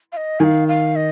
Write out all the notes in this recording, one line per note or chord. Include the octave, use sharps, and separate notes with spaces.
F5
D#5
D#3 F5 G#5
F5
D#5